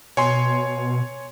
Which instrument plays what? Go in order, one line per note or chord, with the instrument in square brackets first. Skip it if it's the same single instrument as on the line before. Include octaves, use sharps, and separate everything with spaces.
[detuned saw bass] B2 [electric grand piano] C#5 G#5 C6